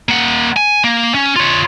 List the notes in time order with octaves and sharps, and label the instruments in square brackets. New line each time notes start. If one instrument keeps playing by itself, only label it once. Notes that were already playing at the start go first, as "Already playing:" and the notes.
[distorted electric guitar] A#3 F#5
G#5
A#3
C#4
F4 C#5